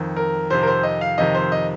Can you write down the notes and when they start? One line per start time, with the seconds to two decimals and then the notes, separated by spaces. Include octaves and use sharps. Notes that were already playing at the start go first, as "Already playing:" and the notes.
Already playing: F2 D#3
0.17 A#4
0.50 F2 C3 D#3 C5
0.63 A#4
0.67 C5
0.83 D#5
1.01 F5
1.18 F2 C3 D#3 D#5
1.35 C5
1.52 D#5